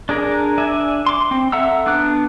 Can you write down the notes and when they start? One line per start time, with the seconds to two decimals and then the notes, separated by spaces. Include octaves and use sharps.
0.09 D4 G#4 A#4
0.58 D4 E5 G#5
1.07 C6 D6
1.31 C4
1.52 A4 E5 F#5 A#5 E6
1.86 B3 D4 D6 F#6